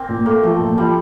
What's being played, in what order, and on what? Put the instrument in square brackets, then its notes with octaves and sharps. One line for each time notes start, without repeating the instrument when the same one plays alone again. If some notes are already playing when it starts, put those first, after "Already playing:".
Already playing: [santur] A#3 C4
[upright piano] A#2
[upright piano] A3 [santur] A#3
[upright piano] F3 [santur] A3
[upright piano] A#2
[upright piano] F3 [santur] G3